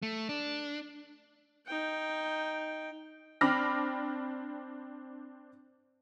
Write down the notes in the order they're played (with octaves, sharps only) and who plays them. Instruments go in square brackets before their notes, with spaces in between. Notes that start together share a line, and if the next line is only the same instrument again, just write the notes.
[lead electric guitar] A3
D4
[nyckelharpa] D#4 G5
[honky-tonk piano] C4 D4 B5 D6 F6 A#6